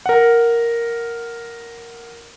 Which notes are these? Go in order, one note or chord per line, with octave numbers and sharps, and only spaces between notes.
A#4 F#5